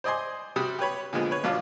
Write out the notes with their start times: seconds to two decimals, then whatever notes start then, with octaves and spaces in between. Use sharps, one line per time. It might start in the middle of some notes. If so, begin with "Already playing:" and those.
0.04 C5 D5 D#5 G#5 C6
0.56 C3 G3 F#4 D#6
0.79 G4 B4 C#5 B5
1.13 A#2 D3 F3 G#3 B3
1.31 B4 C#5
1.44 A1 B2 D4 F4 A5